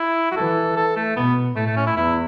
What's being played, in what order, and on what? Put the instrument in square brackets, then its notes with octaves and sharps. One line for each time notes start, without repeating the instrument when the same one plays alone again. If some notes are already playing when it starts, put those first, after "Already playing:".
Already playing: [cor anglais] E4
F#4
[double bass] E3 [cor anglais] A4
[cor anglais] A4
A3
[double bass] B2 [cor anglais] B3
[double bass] A2 [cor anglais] A3
[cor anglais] A3
C#4
E4
[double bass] E2 [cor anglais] E4